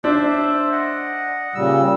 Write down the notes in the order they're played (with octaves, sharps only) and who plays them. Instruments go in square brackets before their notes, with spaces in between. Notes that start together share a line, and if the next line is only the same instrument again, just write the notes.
[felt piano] D4 [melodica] C5 E5
[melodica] D#5 F#5
[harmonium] A#2 C#3 G3 [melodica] E6